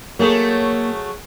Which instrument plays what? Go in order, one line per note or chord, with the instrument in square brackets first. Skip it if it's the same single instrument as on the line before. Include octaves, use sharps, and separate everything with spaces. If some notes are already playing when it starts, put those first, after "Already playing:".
[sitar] F#3 A3 G#4 [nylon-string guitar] A#3